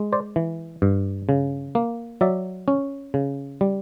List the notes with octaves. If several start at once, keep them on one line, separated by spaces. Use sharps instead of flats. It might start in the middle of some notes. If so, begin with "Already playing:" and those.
Already playing: G#3
C5 D5
E3
G2
C#3
A#3
F#3 D5 E5
C#4
C#3
G3